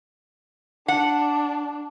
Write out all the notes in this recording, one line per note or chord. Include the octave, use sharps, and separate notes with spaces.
D4 F#5